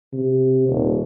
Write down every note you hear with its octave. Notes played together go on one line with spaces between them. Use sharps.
C3
D#1